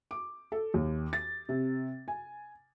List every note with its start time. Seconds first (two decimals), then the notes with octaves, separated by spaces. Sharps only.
0.11 D6
0.52 A4
0.74 D#2
1.13 A6
1.49 C3
2.08 G#5